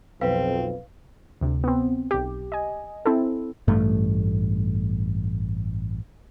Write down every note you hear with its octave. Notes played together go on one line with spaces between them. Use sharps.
B1 F2 C4 B4 F5
D2 C3
B3 C4
B1 G4
D#5 G#5
C4 E4 A4
A1 G2 A3